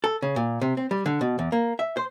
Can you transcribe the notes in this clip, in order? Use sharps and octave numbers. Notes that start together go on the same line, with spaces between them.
A4
C#3
A#2
C3
C4
G3
D3
B2
E2
A#3
E5
C5